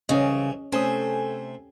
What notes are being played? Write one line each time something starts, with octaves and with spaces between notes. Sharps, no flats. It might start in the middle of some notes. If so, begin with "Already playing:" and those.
C2 C#3 E3 C#4 D#5
C3 A3 C#4 A4 C5 G#5 D#6